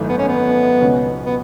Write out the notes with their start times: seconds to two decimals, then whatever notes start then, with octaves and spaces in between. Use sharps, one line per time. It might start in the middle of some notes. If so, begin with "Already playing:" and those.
Already playing: G#1 F#2 E3 A3 D#4
0.09 B3
0.18 C#4
0.28 B3
0.81 C#2 B2 G#3 C#4
1.26 B3